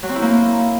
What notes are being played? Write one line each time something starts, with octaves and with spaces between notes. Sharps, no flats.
F#3
C4
E4
A#3